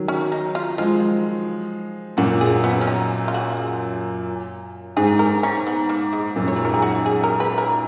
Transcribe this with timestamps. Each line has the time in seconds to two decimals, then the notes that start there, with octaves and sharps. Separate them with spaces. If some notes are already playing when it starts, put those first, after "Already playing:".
Already playing: D#3 F#3
0.08 C#4
0.32 D#4
0.55 F4
0.78 F3 G#3 F4
2.17 F#2 A#2 F#4
2.41 G#4
2.64 B3
2.81 C#4
2.87 D#4
3.28 F4
3.34 F#4
3.57 G#4
4.97 G#2 G#4
5.19 A#4
5.43 C#4
5.67 B3
5.89 A#3
6.13 G#3
6.36 F#2 A#2
6.48 C#5
6.56 B4
6.65 A#4
6.74 G#4
6.82 F#4
7.06 G#4
7.24 A#4
7.40 B4
7.58 A#4